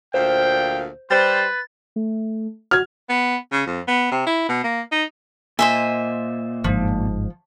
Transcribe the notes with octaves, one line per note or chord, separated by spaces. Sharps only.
D2 A#2 C5 F5 G5
G3 B4 C5 A6
A3
F#4 F6 G#6
B3
C#3
F2
B3
C3
E4
B2
A#3
D#4
A#2 C5 D#5 E5 G#5
G1 G#2 F3